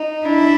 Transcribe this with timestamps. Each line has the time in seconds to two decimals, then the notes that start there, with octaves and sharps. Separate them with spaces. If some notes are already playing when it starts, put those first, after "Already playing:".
Already playing: D#4
0.25 D4 E4